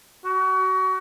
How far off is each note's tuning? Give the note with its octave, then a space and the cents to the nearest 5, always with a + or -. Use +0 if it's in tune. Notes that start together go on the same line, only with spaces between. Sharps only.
F#4 +30